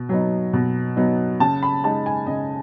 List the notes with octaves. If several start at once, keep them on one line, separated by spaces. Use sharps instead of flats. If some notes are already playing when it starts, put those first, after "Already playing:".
Already playing: B2
F#3 B3 D#4
B2
F#3 B3 D#4
C#3 A5
B5
G#3 D#4 A5
G#5
C#3 D#5